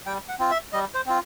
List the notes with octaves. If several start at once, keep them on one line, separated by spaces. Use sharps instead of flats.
G3 G5
F#5
C4 F4
E5
G3 D#5
C5
C4 F4